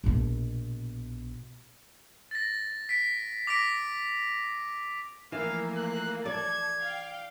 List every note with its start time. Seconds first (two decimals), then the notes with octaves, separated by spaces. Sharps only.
0.04 A#1 B2
2.31 A6 A#6
2.89 B6 D7
3.47 D6 A#6 B6 D7
5.32 E3 F3 A3 A#3 F5
5.76 F#6
6.26 A4 D5 G#6
6.80 F5 G5